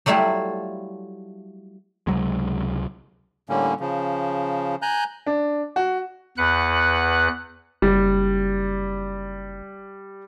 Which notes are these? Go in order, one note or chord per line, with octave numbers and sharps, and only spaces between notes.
F#3 G3 A3 E4 F4
C#2 C3 F#3 G#3
A2 D3 G3 A#3 C#4
C#3 F3
G#5 A#5 F#6 G6
D4
F#4
E2 B4 F#5 F#6
F#1 G3